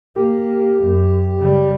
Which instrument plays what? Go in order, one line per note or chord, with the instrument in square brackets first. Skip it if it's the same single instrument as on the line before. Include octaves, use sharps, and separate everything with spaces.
[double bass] A#3 [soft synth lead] G4
[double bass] F#2
C#3 G3